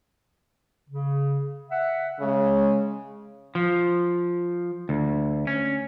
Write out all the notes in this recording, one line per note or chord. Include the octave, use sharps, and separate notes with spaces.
C#3
E5 F#5
C#3 G#3
F3
D2
C#4